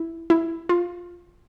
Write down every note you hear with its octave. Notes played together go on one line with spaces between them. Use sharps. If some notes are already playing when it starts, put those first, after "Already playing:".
Already playing: E4
E4
F4